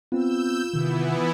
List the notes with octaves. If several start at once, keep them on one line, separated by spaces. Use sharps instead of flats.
B3 C4 F4 E6 G6
C3 D#3 E3 B3 E4